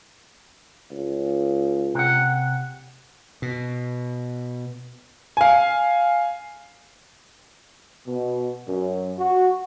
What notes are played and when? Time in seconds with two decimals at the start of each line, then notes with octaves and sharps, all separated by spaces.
0.92 C#2
1.95 C3 F#5
3.42 B2
5.37 F5 G#5
8.06 B2
8.67 F#2
9.17 F#4